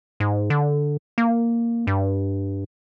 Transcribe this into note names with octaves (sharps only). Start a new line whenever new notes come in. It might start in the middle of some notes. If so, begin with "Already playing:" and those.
G#2
D3
A#3
G2